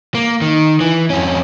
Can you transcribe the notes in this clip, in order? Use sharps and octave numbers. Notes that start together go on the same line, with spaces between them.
A#3
D#3
E3
F2 C#4